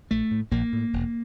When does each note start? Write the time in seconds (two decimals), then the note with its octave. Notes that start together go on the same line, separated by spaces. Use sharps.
0.10 A#1 A3
0.31 A2
0.51 A#1 A#3
0.73 A2
0.93 E1